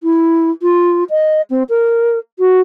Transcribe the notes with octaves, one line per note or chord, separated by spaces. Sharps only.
E4
F4
D#5
C4
A#4
F#4